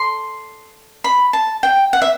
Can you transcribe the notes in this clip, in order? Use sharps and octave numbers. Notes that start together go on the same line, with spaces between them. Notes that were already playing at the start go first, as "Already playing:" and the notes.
Already playing: A4 D5 C6
B5
A5
G5
F#5
E5